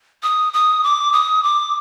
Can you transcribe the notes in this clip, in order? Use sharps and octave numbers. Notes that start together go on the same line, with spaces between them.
D#6
D#6
D6
D#6
D6